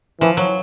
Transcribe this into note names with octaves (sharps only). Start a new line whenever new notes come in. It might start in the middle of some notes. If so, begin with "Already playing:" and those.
E3 F3
F#3